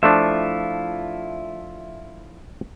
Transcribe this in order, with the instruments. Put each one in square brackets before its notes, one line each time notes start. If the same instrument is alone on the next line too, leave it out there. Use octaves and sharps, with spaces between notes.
[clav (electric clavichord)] F3 A3 D4 [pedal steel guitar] E4 F4 E5